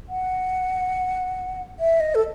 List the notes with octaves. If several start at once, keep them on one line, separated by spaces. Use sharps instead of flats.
F#5
E5
D#5
A4